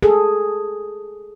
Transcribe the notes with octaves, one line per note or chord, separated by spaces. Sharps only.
G#4 A4